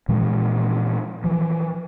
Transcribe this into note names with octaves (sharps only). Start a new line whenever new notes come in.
A#2 E3 F3 G#3
E3 F3